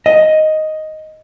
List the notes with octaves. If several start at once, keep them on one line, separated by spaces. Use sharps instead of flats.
D#5